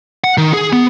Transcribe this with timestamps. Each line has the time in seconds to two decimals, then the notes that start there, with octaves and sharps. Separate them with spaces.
0.24 F#5
0.38 D#3
0.54 G#4
0.73 B3